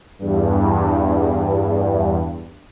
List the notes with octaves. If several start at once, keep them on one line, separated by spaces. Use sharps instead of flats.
E2 G2